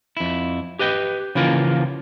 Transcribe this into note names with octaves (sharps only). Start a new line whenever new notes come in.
F2 E4
G4 B4 D#5 G5
C#3 E3 F3 A#3 F4 A#4